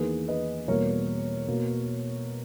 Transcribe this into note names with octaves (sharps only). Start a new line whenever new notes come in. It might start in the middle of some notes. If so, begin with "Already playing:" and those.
Already playing: E2 D#3 A#3 G#4 B4
B4 D#5
E2 B2 G3 A#3 A#4 C#5
B2 A#3